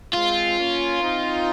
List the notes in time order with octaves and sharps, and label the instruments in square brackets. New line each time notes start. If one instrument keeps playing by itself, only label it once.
[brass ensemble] G#3 C4 [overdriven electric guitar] F4
[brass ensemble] A#3 C#4
C4 D#4